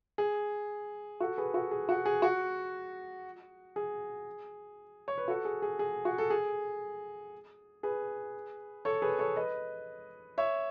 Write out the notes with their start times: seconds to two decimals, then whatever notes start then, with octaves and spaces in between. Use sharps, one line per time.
0.18 G#4
1.20 F#4 A4
1.37 G#4 B4
1.54 F#4 A4
1.71 G#4
1.89 F#4
2.05 G#4
2.22 F#4
3.76 G#4
5.08 C#5
5.18 B4
5.28 F#4 A4
5.45 G#4
5.62 G#4
5.79 G#4
6.05 F#4
6.18 A4
6.30 G#4
7.83 G#4 B4
8.85 A4 C#5
9.02 G#4 B4
9.19 A4 C#5
9.36 B4 D#5
10.38 C#5 E5